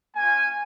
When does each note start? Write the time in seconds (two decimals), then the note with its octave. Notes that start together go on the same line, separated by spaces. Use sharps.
0.16 A#3 C#4 F4 G#5